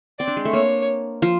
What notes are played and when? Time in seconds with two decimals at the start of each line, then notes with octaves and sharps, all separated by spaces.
0.19 C4 D5
0.27 D4
0.37 G#3
0.45 A3
0.53 A#3 C#5
1.22 F3